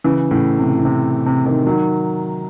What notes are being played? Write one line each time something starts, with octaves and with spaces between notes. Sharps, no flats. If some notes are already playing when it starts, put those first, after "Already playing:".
C#3 E3
A2 C#3
C3
A2
C3
C3
C3 D#3
D#3 F#3